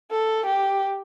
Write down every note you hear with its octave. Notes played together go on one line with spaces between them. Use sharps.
A4
G4